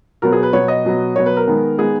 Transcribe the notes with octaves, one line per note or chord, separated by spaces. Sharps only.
B2 F#3 B3 A#4
G#4
B4
B2 F#3 B3 C#5
D#5
B2 F#3 B3
B2 F#3 B3 C#5
B4
A#4
D#3 G#3 B3
D#3 G#3 B3 G#4